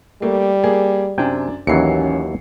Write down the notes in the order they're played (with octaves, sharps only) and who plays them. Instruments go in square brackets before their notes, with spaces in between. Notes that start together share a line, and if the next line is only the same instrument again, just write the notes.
[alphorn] G3 [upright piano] A3 A#3
[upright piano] A#3 G#4
[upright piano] F#2 D4 [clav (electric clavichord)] C3 G5 G#5
[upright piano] A1 C7 C#7 [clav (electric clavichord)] D#2 E3 F#3 [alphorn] C#4